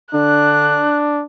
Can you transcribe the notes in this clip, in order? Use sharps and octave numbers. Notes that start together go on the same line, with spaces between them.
D3 D4 F#6